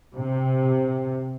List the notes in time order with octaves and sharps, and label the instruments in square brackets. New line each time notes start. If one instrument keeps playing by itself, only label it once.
[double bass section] C3